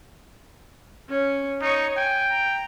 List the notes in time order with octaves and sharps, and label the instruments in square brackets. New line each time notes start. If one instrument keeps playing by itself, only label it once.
[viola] C#4
[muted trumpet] D#4 [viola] C#5 C#6
[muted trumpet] G5 [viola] G#5
[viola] A#5